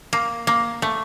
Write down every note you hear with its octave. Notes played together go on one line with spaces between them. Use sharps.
A#3
A#3
A3